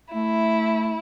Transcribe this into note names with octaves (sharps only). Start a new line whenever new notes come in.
A3 E4